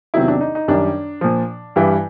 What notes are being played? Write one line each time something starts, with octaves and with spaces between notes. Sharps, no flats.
E2 C3 D#3 F#3 E4
D4
D#4
D#4
F#2 D#3 G3 D4
A#2 F3
G2 E3 G3